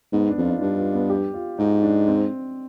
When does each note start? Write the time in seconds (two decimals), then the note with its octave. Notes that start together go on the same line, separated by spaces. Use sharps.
0.13 G#2 B3
0.29 D4
0.38 F2 F4
0.45 D#4
0.61 G2 D4
0.78 F4
0.94 B3
1.10 G4
1.34 F4
1.58 G#2 D#4
1.83 D4
2.08 C4